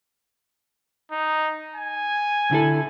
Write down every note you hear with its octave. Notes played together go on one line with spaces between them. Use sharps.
D#4
G#5
D3 E4 A4